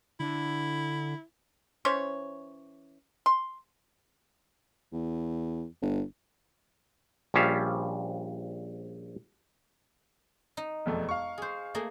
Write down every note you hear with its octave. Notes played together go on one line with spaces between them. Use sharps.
D3 E4
E3 C#4 C5 C#5
C6
E2
G1
A#1 F3 G3 C#4 E5 F5
D#4
E1 F2 A3
F5 C#6
G#4 C5
A3 A#3 G#4